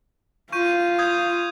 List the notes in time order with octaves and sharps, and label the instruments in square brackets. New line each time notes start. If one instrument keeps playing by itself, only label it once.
[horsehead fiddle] F4 [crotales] C#6 G6 D#7
[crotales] D#6 G6 G#6